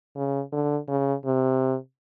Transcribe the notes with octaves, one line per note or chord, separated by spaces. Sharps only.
C#3
D3
C#3
C3